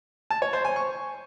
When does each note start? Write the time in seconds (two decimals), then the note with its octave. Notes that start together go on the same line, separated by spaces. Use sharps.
0.30 A5
0.42 C#5
0.53 C5
0.65 G#5
0.76 C#6